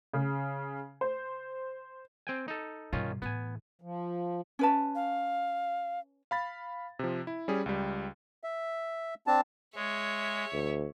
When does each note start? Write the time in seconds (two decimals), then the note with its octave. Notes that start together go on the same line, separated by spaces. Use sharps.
0.13 C#3
1.01 C5
2.27 C4 G5 G#5
2.48 D#4 A4
2.93 G2 B2 D#3 C#4 F4
3.22 A2 E3 B3 G#5
3.82 F3
4.59 C#4 B4 A5
4.95 F5
6.31 F5 B5 A6
6.99 C3 F3
7.27 E4
7.48 G3 C#4 G#4
7.66 C#2 G3
8.44 E5
9.27 C4 D4 A5
9.76 G#3 C#5 E5
10.53 D2